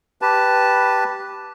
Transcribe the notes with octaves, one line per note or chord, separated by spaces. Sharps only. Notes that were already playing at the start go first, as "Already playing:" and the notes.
G4 B4 A5